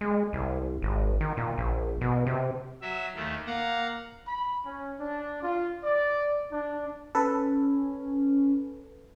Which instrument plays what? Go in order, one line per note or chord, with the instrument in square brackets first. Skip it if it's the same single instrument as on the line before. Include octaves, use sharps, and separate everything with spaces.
[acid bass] G#3
C2
G#1
D#3
A#2
A#1
B2
C3
[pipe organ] F#3 E5
D#2 D#3 A3
[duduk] A#3 [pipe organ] F5 F#5 A#5
[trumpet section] B5
C#4
D4
F4
D5
D4
[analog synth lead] C#4 [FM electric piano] A4 B4